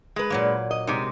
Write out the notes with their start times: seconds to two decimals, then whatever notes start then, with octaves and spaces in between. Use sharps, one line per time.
0.16 G#3 B4
0.30 A#2 F#3 A#3
0.71 D#5
0.87 C3 G#3 D#4